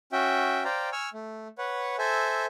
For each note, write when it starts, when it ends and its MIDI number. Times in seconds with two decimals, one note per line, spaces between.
0.12 0.63 61
0.12 0.63 66
0.12 0.63 76
0.12 0.63 79
0.65 0.90 72
0.65 0.90 74
0.65 0.90 77
0.65 0.90 79
0.65 0.90 82
0.92 1.09 80
0.92 1.09 85
0.92 1.09 88
0.92 1.09 89
1.13 1.48 57
1.58 1.96 71
1.58 1.96 73
1.58 1.96 78
1.98 2.46 69
1.98 2.46 72
1.98 2.46 76
1.98 2.46 80